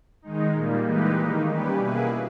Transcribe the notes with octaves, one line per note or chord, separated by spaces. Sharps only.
D#3 G#3 D#4
A#2 G3 A#3
E3 G#3 D#4 G4 B4
D#3 A#3 D#4
G3 C#4 G4 B4
B2 A#3 E4 G#4 B4